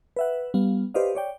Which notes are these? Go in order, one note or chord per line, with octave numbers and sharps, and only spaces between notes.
B4 E5 F#5
G3 B3 F5
G4 B4 C5 D5 D#5 F5
C#5 D5 G5